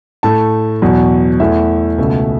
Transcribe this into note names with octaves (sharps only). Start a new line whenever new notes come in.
A2 A3 A5
E2 B2 F#3
E2 E3 A3 E5
C#2 B2 A3